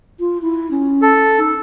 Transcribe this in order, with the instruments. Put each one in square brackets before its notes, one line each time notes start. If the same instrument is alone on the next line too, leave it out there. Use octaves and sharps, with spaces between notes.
[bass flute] F4
E4
C#4
[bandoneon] A4
[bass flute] D#4